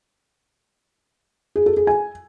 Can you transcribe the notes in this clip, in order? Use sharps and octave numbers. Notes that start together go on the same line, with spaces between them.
G#4
A4
G#4
G#5